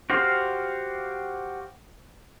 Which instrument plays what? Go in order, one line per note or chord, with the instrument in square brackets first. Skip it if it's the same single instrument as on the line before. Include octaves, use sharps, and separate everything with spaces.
[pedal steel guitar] F#4 G4 C5 F5